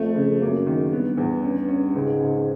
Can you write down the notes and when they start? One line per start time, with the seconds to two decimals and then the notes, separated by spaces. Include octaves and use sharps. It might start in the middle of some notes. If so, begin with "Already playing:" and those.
Already playing: F2 A3
0.15 C#3
0.42 F#2 A#3
0.67 D#3
0.92 G2 B3
1.17 E2
1.43 C#4
1.68 C#4
1.94 C#2 G#2
2.21 C#2